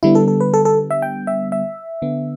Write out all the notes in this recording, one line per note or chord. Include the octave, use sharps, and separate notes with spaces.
D3 G3 B3 E4
A4
A4
B4
A4
A4
E5
G5
E5
E5
D3 B3